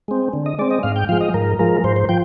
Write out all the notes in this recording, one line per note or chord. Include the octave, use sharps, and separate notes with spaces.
G#3 C4
D3
D#5
G#3 C4 D5
D#5
G#2 F5
G5
F3 G#3 F5
D#5
G#2 A#4
F3 G#3 A#4
G#2 C5
C5
F3 G5